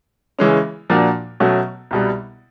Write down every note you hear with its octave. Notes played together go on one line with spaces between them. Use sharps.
C#3 E3 G#3 C#4
A#2 F3 A#3 D4 F#4
B2 F#3 A3 C#4 F#4
C2 B2 G3